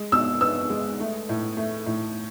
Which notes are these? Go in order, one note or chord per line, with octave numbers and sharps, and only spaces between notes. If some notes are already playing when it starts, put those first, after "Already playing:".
Already playing: G#3
B2 E6
B3 E6
G#3
A3
A2
A3
A2